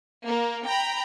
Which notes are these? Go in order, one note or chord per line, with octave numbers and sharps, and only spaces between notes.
A#3
G5 A#5 B5